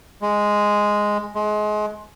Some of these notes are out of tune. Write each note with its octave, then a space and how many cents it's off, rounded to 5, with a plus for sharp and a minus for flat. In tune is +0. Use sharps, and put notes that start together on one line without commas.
G#3 +0
G#3 +30